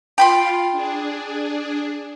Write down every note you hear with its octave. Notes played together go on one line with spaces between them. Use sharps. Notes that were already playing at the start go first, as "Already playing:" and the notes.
F4 G5 B5 C6
D4 G#4